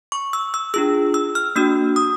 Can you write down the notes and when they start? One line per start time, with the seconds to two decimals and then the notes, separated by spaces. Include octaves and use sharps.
0.12 C#6
0.33 E6
0.54 E6
0.74 D4 F4 G#4 E6
1.14 E6
1.35 F6
1.56 A#3 D4 F#4 E6
1.96 D#6